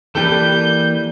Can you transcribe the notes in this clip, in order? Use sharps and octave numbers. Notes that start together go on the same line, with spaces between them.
E3 G3 A#3 G4 A4 B4 G6